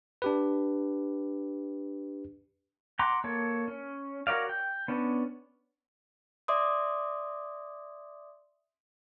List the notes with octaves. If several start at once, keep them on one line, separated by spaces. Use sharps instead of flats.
D4 G4 B4
F#5 A#5 C6 D6
A#3 A4 C#5
C#4
F#4 A#4 C#5 D5 F5
G5
B3 C#4 D4
D5 E5 C6 D6 D#6